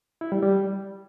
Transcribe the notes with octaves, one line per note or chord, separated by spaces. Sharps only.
E4
G3
G3